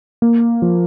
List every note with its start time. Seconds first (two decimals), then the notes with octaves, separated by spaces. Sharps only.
0.22 A#3
0.62 F3